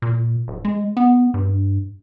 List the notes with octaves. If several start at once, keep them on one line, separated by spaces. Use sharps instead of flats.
A#2
D1
G#3
B3
G2